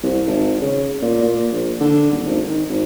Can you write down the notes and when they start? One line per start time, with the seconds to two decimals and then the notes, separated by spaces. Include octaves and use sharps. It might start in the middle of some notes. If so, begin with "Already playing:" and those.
0.03 C2
0.27 G#1
0.61 C#3
1.02 A#2
1.22 A#2
1.52 A#1
1.80 D3
2.11 D#1
2.25 G#1
2.48 D#3
2.69 G#1